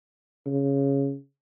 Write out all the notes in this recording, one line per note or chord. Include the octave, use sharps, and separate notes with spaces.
C#3